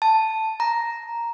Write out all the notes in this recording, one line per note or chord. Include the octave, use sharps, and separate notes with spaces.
A5
A#5